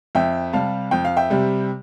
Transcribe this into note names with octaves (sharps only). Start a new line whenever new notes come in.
F2 E5 G5
C3 G3 F5 A5
F2 G5
F5
E5 G5
C3 G3